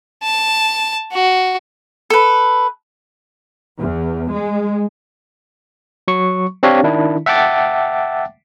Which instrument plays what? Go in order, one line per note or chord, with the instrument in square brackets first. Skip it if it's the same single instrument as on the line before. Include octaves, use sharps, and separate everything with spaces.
[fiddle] A5
F#4
[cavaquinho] A4 B4
[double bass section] E2
G#3
[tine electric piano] F#3 C#6
C4 D4 G4 C#5 F5
D#3 D4 E4
E5 F#5 G5 A5 D6 A6